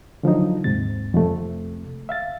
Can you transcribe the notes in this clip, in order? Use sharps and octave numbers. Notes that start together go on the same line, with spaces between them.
D3 F3 F#3 D#4
D#2 G#2 C3 A6
F2 C3 A3
E5 F5 A6